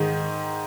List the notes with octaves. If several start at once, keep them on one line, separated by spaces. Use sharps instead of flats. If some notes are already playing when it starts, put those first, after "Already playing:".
Already playing: G#2 D#3